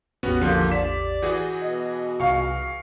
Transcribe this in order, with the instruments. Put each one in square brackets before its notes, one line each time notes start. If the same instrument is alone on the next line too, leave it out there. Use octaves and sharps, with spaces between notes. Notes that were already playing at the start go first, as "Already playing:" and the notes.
[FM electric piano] A1 E2 G4 [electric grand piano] B3 C#4 F#4
[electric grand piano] D3 [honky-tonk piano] F3 [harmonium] A#3 F4
[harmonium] D5 [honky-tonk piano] B6 [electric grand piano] E7
[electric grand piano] E3 F#4 G#4 [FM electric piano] G6
[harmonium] B2 [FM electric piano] D#5
[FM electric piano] C2 [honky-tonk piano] F5 C#6